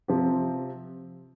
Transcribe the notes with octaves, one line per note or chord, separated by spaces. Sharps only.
C3 F3 C4 G4